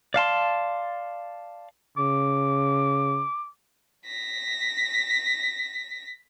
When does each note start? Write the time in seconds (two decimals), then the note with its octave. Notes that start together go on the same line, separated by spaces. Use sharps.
0.14 D5 F5 A5 C6
1.98 C#3 D6
4.06 A#6 B6